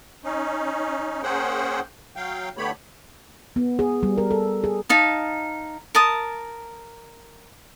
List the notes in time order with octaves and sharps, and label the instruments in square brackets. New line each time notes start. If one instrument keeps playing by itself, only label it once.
[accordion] C#4 D#4
A#3 C#4 G#4 C5 F#5 G5
F#3 F5 G5
D3 A3 B3 G4 C#5 B5
[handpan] B3
G#4
G3
A#4
A4
G#4
[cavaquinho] D#4 F5 A5
A#4 A5 D#6